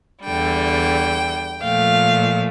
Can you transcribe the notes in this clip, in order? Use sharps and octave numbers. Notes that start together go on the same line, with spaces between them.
E2 D3 G3 G5
A#2 F3 A3 F5